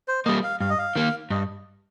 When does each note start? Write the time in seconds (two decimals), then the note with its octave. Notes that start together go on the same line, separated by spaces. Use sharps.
0.08 C5
0.25 G3 A#3 D#5
0.44 F5
0.60 G2 F5
0.70 D#5
0.79 F5
0.96 D#3 A#3
1.30 G2 D#5